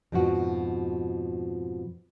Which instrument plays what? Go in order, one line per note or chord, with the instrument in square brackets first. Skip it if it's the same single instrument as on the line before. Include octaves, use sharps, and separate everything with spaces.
[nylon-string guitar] F2 G#2 B2 F3 F#4